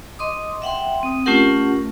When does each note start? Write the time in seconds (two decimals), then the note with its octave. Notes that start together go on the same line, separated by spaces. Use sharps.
0.19 D#5 C6 D6 D#6
0.62 E5 F#5 G5 C6
1.03 C4 D#6
1.26 A3 C#4 F4 G4 A#4 F#5